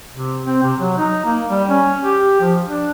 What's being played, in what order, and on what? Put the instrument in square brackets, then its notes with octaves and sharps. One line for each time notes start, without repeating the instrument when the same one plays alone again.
[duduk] C3
C4
C3
F#3
D#4
A#3
G3
C#4
G4
F3
D4